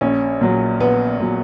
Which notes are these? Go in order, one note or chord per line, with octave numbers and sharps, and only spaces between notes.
A#1 C#4
A#2 F#3
A#1 B3
A#2 F#3